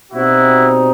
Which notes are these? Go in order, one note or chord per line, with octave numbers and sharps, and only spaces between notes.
B2 G3 C4 D#4 E4 F#4